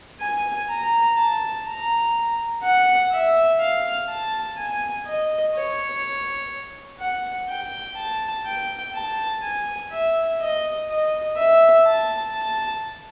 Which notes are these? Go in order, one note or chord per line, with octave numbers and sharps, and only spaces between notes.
G#5
A#5
A5
A#5
F#5
E5
F5
A5
G#5
D#5
C#5
F#5
G5
A5
G5
A5
G#5
E5
D#5
D#5
E5
A5
A5